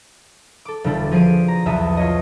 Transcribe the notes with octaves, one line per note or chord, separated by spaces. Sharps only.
A4 D6
E1 D3 G3 E4 A4
F3 G#4 C7 D7 D#7
A#5
B1 E2 E3 E5 A5 D#6
F4 C#5 D#5